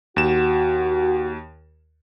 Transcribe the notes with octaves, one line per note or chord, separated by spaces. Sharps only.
D#2 F#4 E7